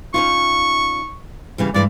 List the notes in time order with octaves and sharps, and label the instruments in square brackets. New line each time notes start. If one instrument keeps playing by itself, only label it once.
[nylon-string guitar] C#4 D#4 F4 [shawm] C#6
[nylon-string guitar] C#3 E3 G3
[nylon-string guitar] G2 E3 G#3 [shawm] D5